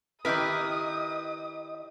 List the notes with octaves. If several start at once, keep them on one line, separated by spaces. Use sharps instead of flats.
D#3 E4 G4 A#4 B4 D#5 D#6